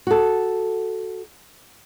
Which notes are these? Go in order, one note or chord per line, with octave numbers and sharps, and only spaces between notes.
F#4 A4